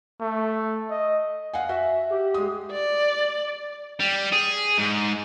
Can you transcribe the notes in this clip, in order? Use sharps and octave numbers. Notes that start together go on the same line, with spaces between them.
A3
D#5
F5 F#5 G#5
F#4 E5
G4
G#3 D#6
D5
G3
G#4
G#2